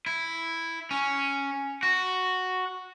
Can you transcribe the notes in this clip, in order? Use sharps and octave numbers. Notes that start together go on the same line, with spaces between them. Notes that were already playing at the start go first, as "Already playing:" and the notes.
E4
C#4
F#4